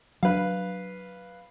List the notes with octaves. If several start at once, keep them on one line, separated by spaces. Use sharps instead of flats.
F#3 D4 B4 F5